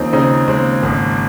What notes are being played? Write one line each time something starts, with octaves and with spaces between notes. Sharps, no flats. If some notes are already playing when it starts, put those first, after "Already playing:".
Already playing: D#2 F3 A#3 C4 C#4 D#4
C#3 C4 D#4
D#2 G#3 C4
G#1